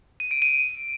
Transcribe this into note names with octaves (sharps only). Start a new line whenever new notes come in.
D#7
D7
D#7